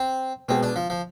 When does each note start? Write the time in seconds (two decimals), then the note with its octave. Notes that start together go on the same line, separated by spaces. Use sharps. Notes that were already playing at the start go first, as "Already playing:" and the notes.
Already playing: C4
0.48 B2 G#3 B3 C4
0.63 D4
0.76 F3
0.90 F3